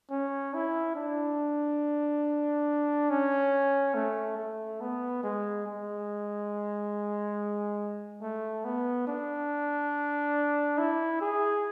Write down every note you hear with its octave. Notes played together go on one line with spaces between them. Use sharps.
C#4
E4
D4
C#4
A3
A3
B3
G#3
G#3
A3
B3
D4
E4
G#4